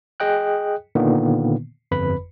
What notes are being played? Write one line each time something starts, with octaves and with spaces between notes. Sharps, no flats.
G#4 D#5 G5 F#6
A#2 D3 D#3 A#3 B3
G1 F2 B4 B5